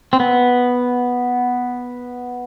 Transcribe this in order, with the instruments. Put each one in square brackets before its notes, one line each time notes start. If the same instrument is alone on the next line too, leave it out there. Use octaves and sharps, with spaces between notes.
[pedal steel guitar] C4
B3